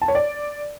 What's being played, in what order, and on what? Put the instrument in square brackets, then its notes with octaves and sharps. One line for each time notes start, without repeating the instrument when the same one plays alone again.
[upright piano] A5
C#5
D5